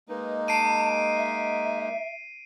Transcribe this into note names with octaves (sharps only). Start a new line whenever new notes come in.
G#3 A#3 D#4 B4
A5 C7 D7 D#7
E5